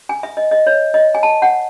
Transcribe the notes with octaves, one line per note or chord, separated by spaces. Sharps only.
G#5
E5
D#5
D#5
C#5
D#5
G#5
A5
F#5